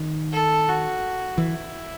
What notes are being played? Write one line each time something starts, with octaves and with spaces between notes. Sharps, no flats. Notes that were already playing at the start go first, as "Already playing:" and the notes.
Already playing: D#3
A4
F#4
E3 E4